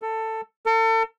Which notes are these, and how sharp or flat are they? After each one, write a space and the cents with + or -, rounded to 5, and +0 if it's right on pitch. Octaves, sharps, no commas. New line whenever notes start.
A4 +15
A4 +40